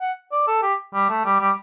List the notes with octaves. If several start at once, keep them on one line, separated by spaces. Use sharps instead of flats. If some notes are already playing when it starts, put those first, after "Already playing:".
F#5
D5
A4
G4
G3
A3
G3
G3